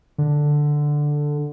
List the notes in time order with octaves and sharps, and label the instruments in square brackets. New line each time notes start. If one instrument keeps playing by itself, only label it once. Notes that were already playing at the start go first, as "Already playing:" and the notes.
[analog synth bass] D3